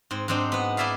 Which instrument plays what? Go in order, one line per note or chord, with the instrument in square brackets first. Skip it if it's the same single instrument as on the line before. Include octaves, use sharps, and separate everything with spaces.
[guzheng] G#2 C4
G#2 F#3 C4 D4 D#4
B3 F#5
D#4 E4 D5 E5 F5